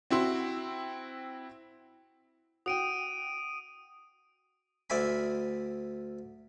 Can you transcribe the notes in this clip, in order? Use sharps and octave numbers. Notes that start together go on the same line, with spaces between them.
C4 E4 F#4 C6
F#4 G5 D#6 D7 D#7
D2 C5 D5 E5 G#5 B5